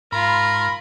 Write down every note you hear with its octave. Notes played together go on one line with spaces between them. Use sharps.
G#2 F4 A#4 B5 C6